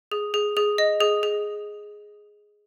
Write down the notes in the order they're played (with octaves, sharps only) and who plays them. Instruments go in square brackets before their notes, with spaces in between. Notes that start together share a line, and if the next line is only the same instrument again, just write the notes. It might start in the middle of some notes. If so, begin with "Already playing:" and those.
[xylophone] G#4
G#4
G#4
D#5
G#4
G#4